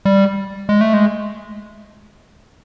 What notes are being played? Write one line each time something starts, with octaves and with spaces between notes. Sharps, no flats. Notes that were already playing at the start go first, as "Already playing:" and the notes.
G3
G#3
A3
G#3